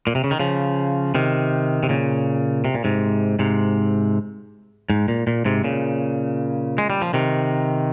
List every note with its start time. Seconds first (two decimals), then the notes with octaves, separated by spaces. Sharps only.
0.07 A#2
0.15 C3
0.24 C#3
0.31 D#3
0.40 C#3 F3
1.15 C3 D#3
1.83 C3
1.89 A#2 C#3
2.65 C3
2.75 A#2
2.84 G#2 C3
3.39 G#2 C3
4.90 G#2
5.08 A#2
5.27 A#2
5.45 G#2 C3
5.64 A#2 C#3
6.78 G#3
6.90 G3
7.02 F3
7.14 C3 D#3